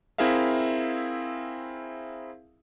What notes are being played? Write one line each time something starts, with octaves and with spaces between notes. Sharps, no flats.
C4 E4 G#4 A#4 E5 F5